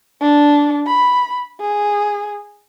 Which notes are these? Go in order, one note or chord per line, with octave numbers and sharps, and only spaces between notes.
D4
B5
G#4